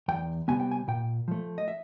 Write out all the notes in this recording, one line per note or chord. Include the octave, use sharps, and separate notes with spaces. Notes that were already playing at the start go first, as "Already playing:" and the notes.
E2 G5
C3 D#3 G3 B3 G#5
G5
G#5
A#2 G5
F3 A3
D#5
E5